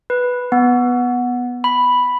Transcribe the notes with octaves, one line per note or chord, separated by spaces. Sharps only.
B4
B3
B5